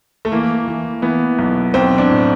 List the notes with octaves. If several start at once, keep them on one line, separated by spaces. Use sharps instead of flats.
A3
E3 A#3
E3
E3 B3
B1
B1 C4
D4
A2